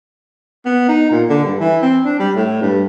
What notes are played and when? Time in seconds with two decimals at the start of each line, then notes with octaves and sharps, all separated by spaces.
0.66 B3
0.88 D#4
1.11 A#2
1.30 D3
1.44 G2
1.60 E3
1.82 C4
2.05 D4
2.19 G3
2.36 A2
2.62 G2